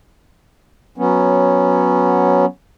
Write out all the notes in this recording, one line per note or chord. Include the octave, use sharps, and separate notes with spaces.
F#3 B3 C#4